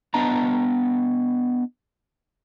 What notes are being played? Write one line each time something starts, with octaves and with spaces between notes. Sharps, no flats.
B3 D4 D#5 A5 A#5